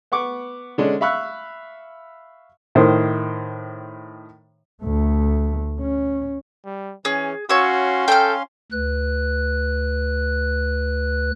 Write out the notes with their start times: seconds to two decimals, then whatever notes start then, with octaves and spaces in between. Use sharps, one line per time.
0.12 B3 F#5 C#6 D6
0.78 D3 G#3 C#4 D4
1.01 E5 F5 B5 C#6 E6 F#6
2.75 A2 D#3 C5
4.83 D2 A3
5.80 C#4
6.65 G3
7.05 E3 C#4 G#4
7.49 C#4 F#4 C#5 F5 C6 E6
8.08 A4 G5 F6
8.72 D2 B4 F#6